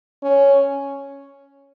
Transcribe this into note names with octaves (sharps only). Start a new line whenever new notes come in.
C#4